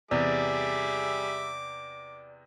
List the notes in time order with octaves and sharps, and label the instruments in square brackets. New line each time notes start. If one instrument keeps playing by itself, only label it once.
[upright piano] E2 C3 [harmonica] G3 G#4 E5 [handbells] D5 [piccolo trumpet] D6